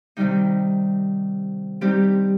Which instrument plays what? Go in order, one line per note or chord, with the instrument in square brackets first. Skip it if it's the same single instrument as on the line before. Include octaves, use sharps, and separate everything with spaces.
[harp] C3 D#3 G3 D#4
G3 C4 D#4 G4